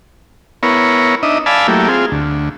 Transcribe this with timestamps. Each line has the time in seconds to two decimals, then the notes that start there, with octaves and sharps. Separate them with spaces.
0.63 B3 E4 A#4 C#5
1.23 D4 D#4 D#5 E5
1.46 D5 F5 G#5 A5 B5 E6
1.68 F#3 A3 A#3 E4 G4
1.88 C4 F4 G#4
2.12 D2